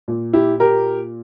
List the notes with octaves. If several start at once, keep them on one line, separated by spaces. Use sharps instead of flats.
A#2
E4 G4
G4 A#4